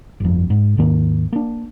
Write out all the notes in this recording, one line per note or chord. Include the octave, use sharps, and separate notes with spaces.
G1 F2
G#2
D#2 G#2 D#3 A#3
A#3 D4